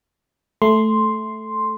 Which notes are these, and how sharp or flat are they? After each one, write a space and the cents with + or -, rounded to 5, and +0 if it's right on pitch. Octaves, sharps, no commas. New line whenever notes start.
A3 -5 C6 +0